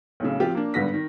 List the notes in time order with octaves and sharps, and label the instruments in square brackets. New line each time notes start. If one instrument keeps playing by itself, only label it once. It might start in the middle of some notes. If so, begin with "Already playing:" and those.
[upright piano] B1 A2 C#3
F3 C4 F4 G4
A#3 D4
G#1 G2 D3 B3 A#6 B6
D#3